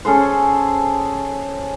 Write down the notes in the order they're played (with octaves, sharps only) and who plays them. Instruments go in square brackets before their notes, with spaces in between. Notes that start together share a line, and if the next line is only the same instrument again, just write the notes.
[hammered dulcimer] C#4 G#4 A4 C5